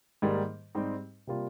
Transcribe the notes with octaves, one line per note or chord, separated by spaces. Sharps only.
G#2 D#3 G3 A#3
G#2 G3 C4 D#4 G4
C3 G3 A#3 F4